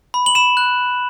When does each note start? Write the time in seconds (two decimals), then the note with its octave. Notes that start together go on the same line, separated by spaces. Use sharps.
0.14 B5
0.26 F#7
0.35 B5 E7
0.57 F#6